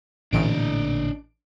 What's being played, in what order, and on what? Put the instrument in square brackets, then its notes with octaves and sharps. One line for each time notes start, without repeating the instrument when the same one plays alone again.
[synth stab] A1 D7 [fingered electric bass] A#2 D3 [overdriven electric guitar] D4 D#5